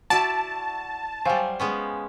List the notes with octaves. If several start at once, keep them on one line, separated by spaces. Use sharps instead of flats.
E4 F#4 D5 A5
F#3 G3 C5 F5 G#5
G#3 B3 C#4